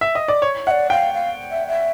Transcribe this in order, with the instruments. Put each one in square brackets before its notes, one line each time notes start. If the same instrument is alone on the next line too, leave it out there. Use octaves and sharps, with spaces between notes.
[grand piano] E5
D#5
D5
C#5
[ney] E5 [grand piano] F#5
[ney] D5
[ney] F5 [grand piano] G5
[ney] F5
E5
E5